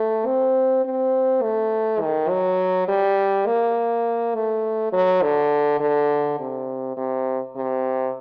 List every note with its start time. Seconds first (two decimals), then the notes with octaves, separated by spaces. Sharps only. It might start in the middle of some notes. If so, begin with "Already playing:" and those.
Already playing: A3
0.26 C4
0.85 C4
1.42 A3
2.02 D#3
2.30 F#3
2.88 G3
3.46 A#3
4.35 A3
4.93 F#3
5.22 D3
5.80 D3
6.40 C3
6.97 C3
7.56 C3